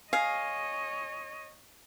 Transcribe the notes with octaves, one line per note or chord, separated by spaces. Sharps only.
G#4 C#5 D#5 F5